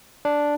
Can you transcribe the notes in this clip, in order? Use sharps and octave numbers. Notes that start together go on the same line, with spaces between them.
D4